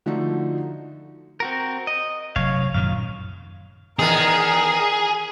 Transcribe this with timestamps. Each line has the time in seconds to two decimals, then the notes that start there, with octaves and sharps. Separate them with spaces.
0.06 D3 F3 A3 D#4 F#4
1.40 C4 F#4 A#4
1.87 D#5
2.36 F1 F#3 C#5 F5
2.74 F#2 A#2 D#3 F5
3.99 E2 D#3 B3 G#4 A#4